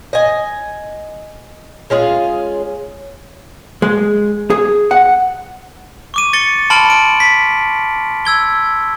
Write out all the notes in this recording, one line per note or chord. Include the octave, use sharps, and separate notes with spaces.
D#5 G#5
G#3 C#4 F4 G#4
G#3
G#4
F#5
C#6 D6 D#7
A6 C#7 G7
A5 B5 C6 F6 D7 F#7
B5 D7
B6
E6 G#6 G7